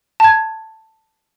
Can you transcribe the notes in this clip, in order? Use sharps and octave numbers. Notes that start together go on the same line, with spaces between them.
A5 G#6